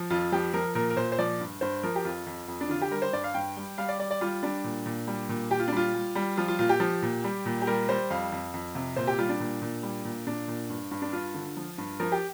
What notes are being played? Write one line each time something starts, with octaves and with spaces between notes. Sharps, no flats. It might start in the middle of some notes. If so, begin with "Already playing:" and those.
Already playing: F3
F2 F4
F3 G4
F3 A#4
A#2 A#4
A#4
A#2 C5
C5
F3 D5
G2
G2 C5
F3 A#4
G4
F2 F4
F2
F2
D4
D3 F4
G4
G3 A#4
C5
G2 D5
F5
G2 G5
G3
G3 F5
D5
G3 D5
D5
G3 F4
G3 D4
A#2
A#2
G3
A#2
A#2 G4
F4
D4
G3 F4
G3
G3
F3 F4
F4
A#2 F4
G4
F3
A#2
G3
A#2
G4
G3 A#4
G3 C5
F2 F5
F2
F2
C3
A#2 C5
G4
G3 F4
D4
A#2
A#2
G3
A#2
A#2 D4
A#2
G2
G2
D4
G2 F4
D3
F3
G2
F3 A#4
G4